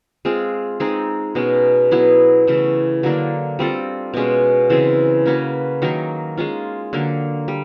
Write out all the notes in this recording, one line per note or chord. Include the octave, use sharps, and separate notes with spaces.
G#3 C4 F4 G#4
G#3 C4 D#4 G#4
B2 G#3 C#4
F#3 B3 E4 G#4
C#3 E3 A3
D3 F#3 A#3 D4
G3 C4 F4 A4
B2 G#3 C#4
C#3 E3 G#3 C4
A#3 C#4 F#4 B4
D#3 F#3 A#3 D#4
G#3 C#4 F4
D3 F#3 A#3
G3